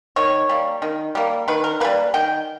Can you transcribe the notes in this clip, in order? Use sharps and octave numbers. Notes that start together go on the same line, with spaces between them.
D#3 C#5
G3 A#3
D#3
G3 A#3
D#3 B4
A#4
G3 A#3 B4
D#3 G5